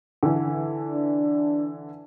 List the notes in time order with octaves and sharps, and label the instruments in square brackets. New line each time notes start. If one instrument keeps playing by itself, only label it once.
[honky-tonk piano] D3 E3
[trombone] D4